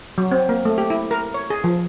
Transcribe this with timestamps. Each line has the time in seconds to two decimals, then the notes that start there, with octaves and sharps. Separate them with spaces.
0.18 F#3
0.31 C4
0.49 A#3
0.65 A3
0.78 G4
0.90 E4
1.11 A#4
1.34 C#5
1.50 G#4
1.64 F3